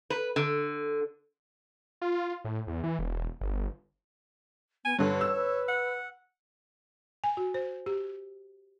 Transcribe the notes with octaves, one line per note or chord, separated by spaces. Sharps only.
B4
D3
F4
A2
E2
E3
E1
G1
B3 G#5
G2 D3 B4 C#5
E6
B4
F#5
G#5
F#4
C5
G4